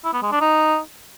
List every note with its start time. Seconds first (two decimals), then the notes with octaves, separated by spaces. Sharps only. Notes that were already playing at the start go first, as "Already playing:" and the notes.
0.04 E4
0.14 B3
0.23 G#3
0.32 D4
0.41 D#4